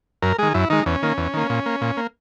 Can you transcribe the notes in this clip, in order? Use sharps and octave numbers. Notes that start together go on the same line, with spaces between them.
F#2 A#4
D#3 G#3 G#4
F#2 E4
D#3 G#3 D#4
E2 C#4
D#3 A#3
E2
D#3 A#3
A#2
A#3
A#2
A#3